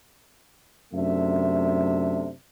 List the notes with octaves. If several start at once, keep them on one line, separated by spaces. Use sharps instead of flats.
F#2 C3 A3 D4 E5